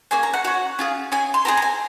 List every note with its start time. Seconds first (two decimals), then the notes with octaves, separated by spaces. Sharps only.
0.11 A#3 C#4 G#4 G#5
0.23 A#5
0.33 F#5
0.44 C#4 F#4 F#5
0.79 C#4 F4 G#4
1.12 C#4 G#4 G#5
1.34 C6
1.45 C4 F4 G#4 A#5
1.57 A#5
1.62 G#5